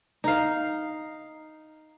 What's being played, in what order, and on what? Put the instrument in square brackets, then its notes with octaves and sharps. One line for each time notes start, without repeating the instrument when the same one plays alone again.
[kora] D#4 F5